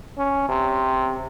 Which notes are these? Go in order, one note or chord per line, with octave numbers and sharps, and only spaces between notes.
C#4
C3